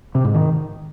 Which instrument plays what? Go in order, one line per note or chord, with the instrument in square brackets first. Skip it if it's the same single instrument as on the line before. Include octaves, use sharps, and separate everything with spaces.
[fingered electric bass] C3
G#2
D#3